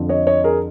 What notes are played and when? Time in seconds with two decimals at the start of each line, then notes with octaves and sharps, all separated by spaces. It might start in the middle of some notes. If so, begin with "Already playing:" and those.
Already playing: F2 D3 F3
0.09 C#5 D#5
0.27 C#5 D#5
0.44 G#4 A#4